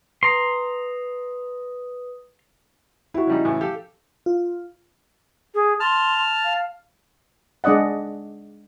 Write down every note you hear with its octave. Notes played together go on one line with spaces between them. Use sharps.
B4 A#5 C6 D#6
E4 F#4
C#3 G3 D#4
A2 C#3 E3
G4 A4 F5
F4
G#4
A5 C6 F6
F5
G#3 D4 D5 D#5 F#5